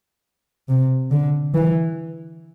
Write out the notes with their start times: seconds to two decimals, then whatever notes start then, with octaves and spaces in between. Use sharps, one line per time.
0.69 C3
1.11 D3
1.54 E3